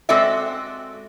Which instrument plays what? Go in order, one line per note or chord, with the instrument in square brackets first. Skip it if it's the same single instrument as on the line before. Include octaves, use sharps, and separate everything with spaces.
[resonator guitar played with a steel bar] G#3 C4 F#4 A4 D5 E5